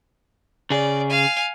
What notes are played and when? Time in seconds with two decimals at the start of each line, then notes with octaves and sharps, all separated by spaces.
0.70 C#3 G#4 D5
1.09 F5 G#5